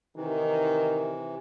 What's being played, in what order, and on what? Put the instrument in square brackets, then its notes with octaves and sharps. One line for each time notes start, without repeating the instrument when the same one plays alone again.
[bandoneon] C3 E3 [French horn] D#3